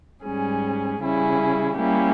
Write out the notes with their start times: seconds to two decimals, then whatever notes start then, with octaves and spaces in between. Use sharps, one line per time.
0.23 G#2 G3 C#4 G#4
1.00 C#3 G3 C#4 E4 G#4
1.78 G3 A#3 C#4 E4 G4